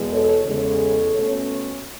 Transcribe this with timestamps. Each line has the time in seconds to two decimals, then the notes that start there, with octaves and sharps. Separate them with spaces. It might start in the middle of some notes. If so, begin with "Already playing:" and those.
Already playing: E2 B2 G#3
0.12 A4 C#5
0.46 E2 C#3 G#3 A4 C#5
1.15 B2 A3 C#4